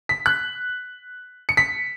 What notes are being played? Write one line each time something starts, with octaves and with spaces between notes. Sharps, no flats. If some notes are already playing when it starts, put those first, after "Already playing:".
B6
F#6
C#7
B6